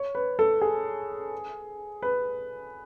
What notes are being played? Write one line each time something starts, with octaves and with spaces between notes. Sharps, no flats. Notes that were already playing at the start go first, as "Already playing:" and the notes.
Already playing: C#5
B4
A4
G#4
B4